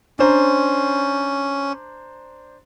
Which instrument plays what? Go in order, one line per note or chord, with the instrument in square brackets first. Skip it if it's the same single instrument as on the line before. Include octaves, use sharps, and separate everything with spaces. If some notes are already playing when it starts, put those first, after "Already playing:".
[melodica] C#4 [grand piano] D4 C5 A#5